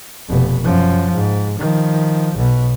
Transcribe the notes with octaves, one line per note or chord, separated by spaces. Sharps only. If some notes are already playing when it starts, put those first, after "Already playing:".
F1 B2
F#2 F3
G#2
D#3 F3
B1 B2